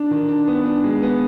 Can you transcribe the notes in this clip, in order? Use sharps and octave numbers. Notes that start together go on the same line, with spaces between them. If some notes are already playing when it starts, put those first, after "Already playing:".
Already playing: D4
D#3
D4
B3
D4
G#3
B3